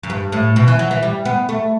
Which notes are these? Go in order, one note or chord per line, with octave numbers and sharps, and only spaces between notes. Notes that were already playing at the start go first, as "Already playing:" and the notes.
F#2
G2
A2
B2
E3
F#3
E3
G3
B3
A3